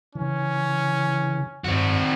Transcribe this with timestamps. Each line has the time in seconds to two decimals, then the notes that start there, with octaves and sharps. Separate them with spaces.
0.15 C#3 E3 C#4
1.64 G2 C4 F#4